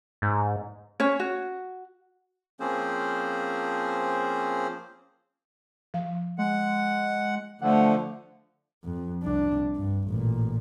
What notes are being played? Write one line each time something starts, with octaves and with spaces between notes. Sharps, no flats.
G#2
C#4 C#5
F#4
F3 A#3 C4 C#4 G#4 C5
F3 F5
G#3 F#5
D3 F3 A3 F#5
F2
C2 D4
G2
A1 A#2